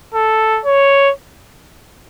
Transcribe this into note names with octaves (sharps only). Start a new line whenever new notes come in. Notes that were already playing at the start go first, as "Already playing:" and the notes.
A4
C#5